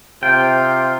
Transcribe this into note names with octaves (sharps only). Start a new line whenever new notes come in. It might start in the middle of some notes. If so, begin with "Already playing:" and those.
C3 F4 G5